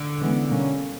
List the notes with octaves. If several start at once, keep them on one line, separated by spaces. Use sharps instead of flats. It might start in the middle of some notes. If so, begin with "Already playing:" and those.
Already playing: D3
C#3 E3 G#3 B3
B2 G3 A#3 C#4